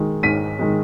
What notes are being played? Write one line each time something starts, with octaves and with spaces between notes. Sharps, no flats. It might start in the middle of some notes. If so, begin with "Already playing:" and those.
Already playing: D#3 G#3
G#2 B6 D#7
D#3 G#3